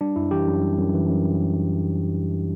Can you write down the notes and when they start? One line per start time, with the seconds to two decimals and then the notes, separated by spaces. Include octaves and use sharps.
0.01 G3 D4
0.16 F#2 E4
0.31 E3 G4
0.47 F#2
0.62 G3
0.78 F#2
0.94 E3
1.09 F#2